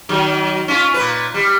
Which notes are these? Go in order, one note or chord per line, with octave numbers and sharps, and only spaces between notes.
D#3 F#3
C#4 F4
A#2 B4
G3